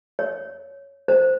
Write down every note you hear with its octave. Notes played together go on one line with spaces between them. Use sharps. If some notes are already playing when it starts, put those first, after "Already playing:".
C#5
C5